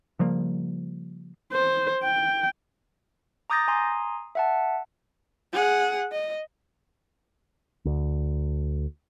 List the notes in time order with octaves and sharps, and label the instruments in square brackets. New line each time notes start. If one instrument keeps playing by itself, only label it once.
[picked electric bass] C#3 F3 G3 A#3
[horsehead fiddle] C5
G5
[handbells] A#5 D6 D#6 G6 A6 A#6
G#5 A#5 C6 D#6
E5 F#5 A5
[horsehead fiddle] G#4 F#5
D#5
[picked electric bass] D2